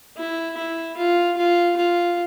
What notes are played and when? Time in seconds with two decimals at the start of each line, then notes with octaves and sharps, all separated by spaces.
0.17 E4
0.57 E4
0.97 F4
1.37 F4
1.77 F4